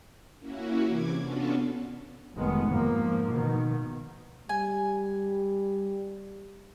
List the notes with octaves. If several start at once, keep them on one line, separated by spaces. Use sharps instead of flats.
A#3 C#4 E4 F#4
C3 E3 D6 G#6
B3 C#4 D4 F4 F#4 A4
F1 D#3 G#3 B3
G#2 F3 A#3
B2 D#3
G3 G#5